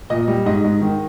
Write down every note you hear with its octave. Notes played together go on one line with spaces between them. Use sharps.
A#2 D#5
G3
G#2 D#5
G#2
D#3